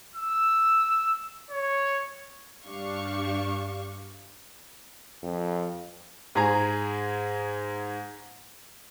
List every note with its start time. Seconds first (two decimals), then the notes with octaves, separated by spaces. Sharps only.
0.16 E6
1.51 C#5
2.65 G2 D4 G4 F5 C#6
5.23 F2
6.35 G#2 G#4 A#5